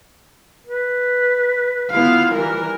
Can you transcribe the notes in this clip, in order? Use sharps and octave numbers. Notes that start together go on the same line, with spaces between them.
B4
B3 E4 F4 F5
E3 G3 A#4